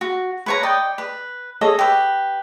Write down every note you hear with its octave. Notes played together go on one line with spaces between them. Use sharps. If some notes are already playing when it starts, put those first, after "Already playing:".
F#4
B4 C#5 A#5
D5 D#5 G5 D#6
B4
G#4 A4 C#5 D#5
G4 B4